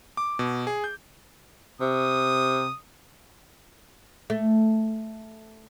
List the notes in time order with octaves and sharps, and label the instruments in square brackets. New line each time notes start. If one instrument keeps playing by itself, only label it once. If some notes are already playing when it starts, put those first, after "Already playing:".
[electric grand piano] D6
B2
G#4
G6
[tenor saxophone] C3 [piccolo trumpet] D#6
[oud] A3